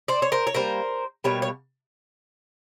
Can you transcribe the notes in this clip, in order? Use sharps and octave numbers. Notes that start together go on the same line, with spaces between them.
C5 D5
C#5
A#4 C5
C#5
D3 G3 A#3 A#4 C5
B2 G3 A#3 C#5
C#5